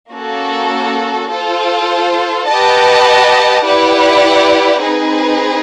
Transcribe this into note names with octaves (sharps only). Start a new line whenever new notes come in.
A#3 C#4 F#4 A4
F4 A4 C5
G4 B4 D#5 F#5 A5
E4 G4 B4 D5 F#5
C4 D#4 G#4 B4